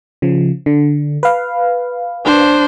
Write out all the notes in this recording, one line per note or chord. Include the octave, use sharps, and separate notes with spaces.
C#3 F3
D3
B4 F5
D4 C5